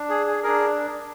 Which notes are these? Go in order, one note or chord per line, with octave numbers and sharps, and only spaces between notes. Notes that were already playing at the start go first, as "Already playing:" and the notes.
Already playing: D4
G#4
G#4
D4 G#4 A#4